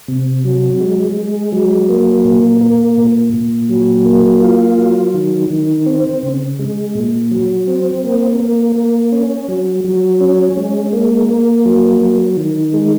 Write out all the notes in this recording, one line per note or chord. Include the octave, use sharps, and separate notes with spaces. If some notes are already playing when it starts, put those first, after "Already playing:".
C3
F#3
G#3
G#3
F#3
A#3
A#2
A#3
A#2
A#2
F#3
A#3
F4
F#3
D#3
D#3
C4
C#3
G#3
A#2
F#3
C4
A#3
A#3
A#3
C#4
F#3
F#3
C#4
G#3
A#3
A#3
F#3
F#3
D#3
G#3